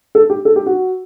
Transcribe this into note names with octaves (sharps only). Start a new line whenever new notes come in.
A4
G4
A4
G4
F#4